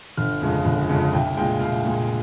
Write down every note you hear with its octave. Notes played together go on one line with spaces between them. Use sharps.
G1 F6
F2 C#3 G#3
G1
F2 C#3 G#3
C2 G5
A#2 G#3 G5
C2 F5
A#2 G#3